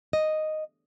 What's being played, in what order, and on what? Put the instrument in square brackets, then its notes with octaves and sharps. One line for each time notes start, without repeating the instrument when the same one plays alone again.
[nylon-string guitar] D#5